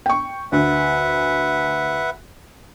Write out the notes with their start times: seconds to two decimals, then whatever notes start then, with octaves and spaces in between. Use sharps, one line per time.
0.06 G5 C#6
0.52 D2 B4 E5 F#5